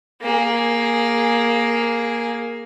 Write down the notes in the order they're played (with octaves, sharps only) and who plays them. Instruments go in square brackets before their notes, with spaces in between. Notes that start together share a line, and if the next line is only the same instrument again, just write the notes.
[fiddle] A#3 G#4